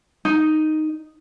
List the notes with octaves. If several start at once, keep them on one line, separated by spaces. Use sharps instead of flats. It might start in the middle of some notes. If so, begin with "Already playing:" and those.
D#4